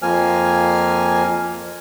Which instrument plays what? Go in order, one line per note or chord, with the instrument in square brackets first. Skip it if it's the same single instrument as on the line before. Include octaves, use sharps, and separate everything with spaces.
[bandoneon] F2 F3 A#3 G#5 F6